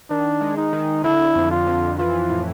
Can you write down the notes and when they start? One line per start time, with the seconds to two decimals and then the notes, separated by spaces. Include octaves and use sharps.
0.10 D#3 D4
0.41 G#3
0.57 D#4
0.73 D#3
1.04 D3 E4
1.35 F2
1.51 F4
1.67 F2
1.99 E3 F4
2.29 A2